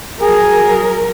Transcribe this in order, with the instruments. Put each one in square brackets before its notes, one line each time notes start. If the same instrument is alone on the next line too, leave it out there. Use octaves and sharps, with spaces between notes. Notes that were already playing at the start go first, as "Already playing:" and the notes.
[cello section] F#3 A#4 [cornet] G#4